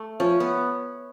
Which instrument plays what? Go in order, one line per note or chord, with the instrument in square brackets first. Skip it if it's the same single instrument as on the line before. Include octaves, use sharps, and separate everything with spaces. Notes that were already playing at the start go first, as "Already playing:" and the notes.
Already playing: [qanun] A3
[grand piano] F3 [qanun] C#4
[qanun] B3